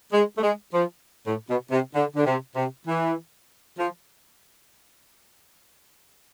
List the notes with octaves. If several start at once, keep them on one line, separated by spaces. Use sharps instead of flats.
G#3
A3
G#3
F3
A2
B2
C3
D3
D3
C3
C3
E3
F3